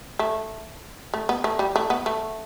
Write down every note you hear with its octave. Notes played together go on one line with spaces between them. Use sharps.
A3
A3
B3
A3
G3
A3
B3
A3